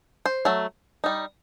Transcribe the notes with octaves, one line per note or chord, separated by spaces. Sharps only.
C5
F#3 A3
G3 D#4